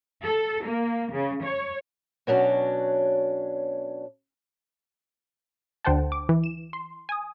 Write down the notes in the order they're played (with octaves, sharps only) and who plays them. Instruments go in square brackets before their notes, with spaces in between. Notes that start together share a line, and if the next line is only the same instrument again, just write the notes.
[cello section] A4
A#3
C#3
C#5
[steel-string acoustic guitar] B2 F#3 C#4 D4
[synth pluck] D2 D3 C5 F#5 G5 A5
D6
E3
E7
C6
G#5 D#6